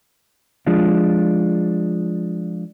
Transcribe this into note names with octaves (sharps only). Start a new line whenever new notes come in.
F3 G#3 D4 F4